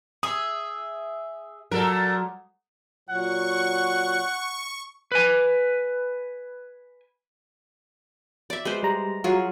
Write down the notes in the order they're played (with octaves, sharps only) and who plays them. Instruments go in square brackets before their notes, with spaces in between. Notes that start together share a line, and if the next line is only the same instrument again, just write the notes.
[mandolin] G#4 E5 [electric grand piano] D#6
[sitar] A#2 A4 A#4 [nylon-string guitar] F#3
[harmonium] A#2 F#3 [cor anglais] F#5 [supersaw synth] C#6
[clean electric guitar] B4 G#5
[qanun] D5 E5
G#3 B4 C5
[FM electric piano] G3 A#5
[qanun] F#3 F4 G#4